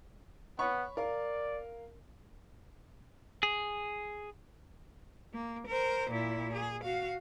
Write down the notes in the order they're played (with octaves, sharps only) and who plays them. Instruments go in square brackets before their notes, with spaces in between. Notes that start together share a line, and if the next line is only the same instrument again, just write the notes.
[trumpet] B3 [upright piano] C#5 B5 C#6
[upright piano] A#4 F5 [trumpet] D5
[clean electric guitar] G#4
[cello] A#3
A#4 C5
A#2 E4
G#4
F#4 F5